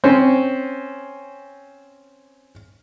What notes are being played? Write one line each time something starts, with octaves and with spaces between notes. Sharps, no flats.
C4 C#4